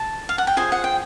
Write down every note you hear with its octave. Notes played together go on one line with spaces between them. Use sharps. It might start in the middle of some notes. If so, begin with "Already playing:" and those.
Already playing: A5
F5
F#5
G5
F4 G#4 C5 G#5
F#5
G5